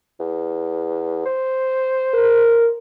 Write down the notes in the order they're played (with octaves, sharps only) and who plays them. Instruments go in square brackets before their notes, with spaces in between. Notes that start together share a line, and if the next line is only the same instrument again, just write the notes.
[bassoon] E2
C5
[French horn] A#4